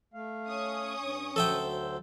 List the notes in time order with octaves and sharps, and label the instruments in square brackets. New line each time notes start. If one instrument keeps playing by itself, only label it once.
[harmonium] A3 F5
[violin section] C#4 C#6 D#6
[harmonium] G2
[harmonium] D2 F#3 C5 [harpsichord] A4 E5 G5